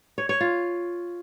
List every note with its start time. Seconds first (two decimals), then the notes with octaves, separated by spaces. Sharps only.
0.18 C#5
0.29 C#5
0.41 F4